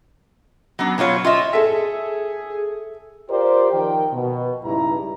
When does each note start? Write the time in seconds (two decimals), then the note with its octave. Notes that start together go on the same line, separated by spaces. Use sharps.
0.79 F#3 B3 D4
0.98 B2 F#3 F4 C#5
1.25 F4 D#5 E5
1.53 G#4 A4 E5
3.30 F4 G4 A#4 C5 D5
3.72 D#3 F3 A#4 G5
4.13 B2
4.64 C#2 G2 D#4 E4 A#5